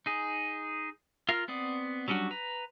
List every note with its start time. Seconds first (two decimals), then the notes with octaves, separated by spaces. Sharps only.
0.06 D#4 G#4
1.29 F4 A#4 F5
1.48 B3 C4 D5 D#6
2.08 F#3 G3 C#4 D4 F#4
2.31 B4 A#5